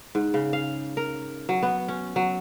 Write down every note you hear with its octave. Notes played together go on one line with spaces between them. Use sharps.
G#2
C#3
F5
A#4
F#3
B3
C#4
F#3